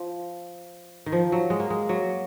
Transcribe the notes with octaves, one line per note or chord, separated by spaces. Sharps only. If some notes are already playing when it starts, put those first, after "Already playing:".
Already playing: F3
D#3
F3
F#3
G#3
A#3
G#3
F#3